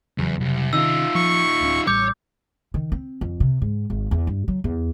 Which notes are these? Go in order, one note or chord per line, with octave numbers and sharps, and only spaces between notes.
F1 E2 C#3 F#3
C2
C3 D#3 C#4 D#4 F4 E6
F3 C#6
D1 C#4
A1 G3 C#5 D6 G6
D#3
C4
F2
C3
G#2
G#1
E2
G2
F#3
E2